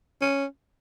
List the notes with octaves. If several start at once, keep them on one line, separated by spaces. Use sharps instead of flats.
C#4